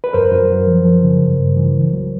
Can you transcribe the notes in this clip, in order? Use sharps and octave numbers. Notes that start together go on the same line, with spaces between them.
B4
F#2 A#4 C5
F#2
F#2
F3
F3
C#3
G2
G2
E3
C2
F#3